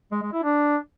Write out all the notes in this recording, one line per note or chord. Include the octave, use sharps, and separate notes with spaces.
G#3
G#3
E4
D4